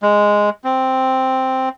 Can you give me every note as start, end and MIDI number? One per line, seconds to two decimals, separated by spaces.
0.02 0.50 56
0.64 1.69 60